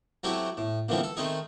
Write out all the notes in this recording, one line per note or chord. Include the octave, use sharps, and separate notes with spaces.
F#3 A3 C4 E4 F#4 G4
A2
A#2 D3 E3 F3 G3 C4
A4
D#3 A3 C4 D#4 G#4